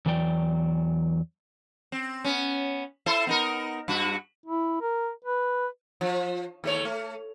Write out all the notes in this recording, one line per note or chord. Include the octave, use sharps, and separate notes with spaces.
E2 E3 F#3 D5 G5
C4
B3 C#4
E4 A4 C5
B3 D#4 A#4
G2 F#4
E4
A#4
B4
F3
D#2 A3 C#5
A3